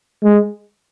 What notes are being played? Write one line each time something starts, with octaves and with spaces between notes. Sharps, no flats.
G#3